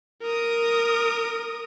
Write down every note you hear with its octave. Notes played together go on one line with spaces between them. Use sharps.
A#4 D#6